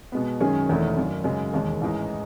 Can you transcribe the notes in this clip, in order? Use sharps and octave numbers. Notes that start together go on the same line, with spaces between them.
B2 G#3 B3
F#2 D#3 G#3 C#4 G#4
E1 E2 D#3 A3 E4
G#1 F#2 D#3
F#2 C#3 G#3 C#4
E1 D#2 D#3 G#3
A1 G#2 E3 G#3 D#4